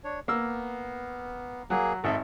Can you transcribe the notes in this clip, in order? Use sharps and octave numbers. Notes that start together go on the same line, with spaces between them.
D4 C#5
A#3 B3 E6
F#3 A#3 G#4
G#1 G#3 G#4 A4 E5